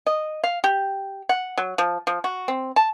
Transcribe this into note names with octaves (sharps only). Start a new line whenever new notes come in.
D#5
F5
G4
F#5
F#3
F3
F3
F#4
C4
A5